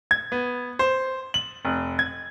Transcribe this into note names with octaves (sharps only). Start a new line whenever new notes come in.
G#6
B3
C5
F#7
F1
G#6